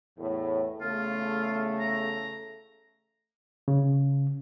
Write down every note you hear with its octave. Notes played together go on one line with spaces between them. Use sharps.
E2 A2
E2 C#3 A3 F4
A#5
C#3